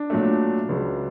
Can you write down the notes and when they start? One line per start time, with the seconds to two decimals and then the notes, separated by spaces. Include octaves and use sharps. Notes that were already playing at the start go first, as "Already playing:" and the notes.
Already playing: D4
0.10 A#2 F#3 A3
0.69 C#2 C#3 F#3